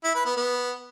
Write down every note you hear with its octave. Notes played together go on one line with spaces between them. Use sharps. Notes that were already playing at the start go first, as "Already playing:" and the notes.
E4
B4
B3
B3